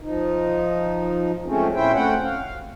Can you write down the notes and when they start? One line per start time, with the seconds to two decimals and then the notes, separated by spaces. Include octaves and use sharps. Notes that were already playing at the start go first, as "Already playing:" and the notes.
0.01 F3 D#4
1.46 F3 G#3 A3 C4 C#4
1.74 A#2 C#4 E4 C5 E5 G5
1.94 A3 C4 C#4 F#5 G5
2.24 F5